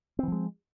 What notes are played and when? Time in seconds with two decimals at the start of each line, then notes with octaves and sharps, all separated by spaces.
0.19 C4
0.23 E3
0.28 F3
0.32 G#3